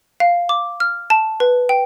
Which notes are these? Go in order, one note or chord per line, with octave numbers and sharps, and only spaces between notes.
F5
D6
F6
A5
B4
G5